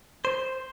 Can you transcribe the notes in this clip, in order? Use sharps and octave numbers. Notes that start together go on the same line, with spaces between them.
C5